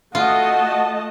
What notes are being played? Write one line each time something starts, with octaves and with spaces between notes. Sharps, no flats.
A3 F4 F#4 D#5 A5